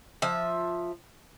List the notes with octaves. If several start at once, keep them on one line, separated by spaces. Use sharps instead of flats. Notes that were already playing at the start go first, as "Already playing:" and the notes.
F3 E5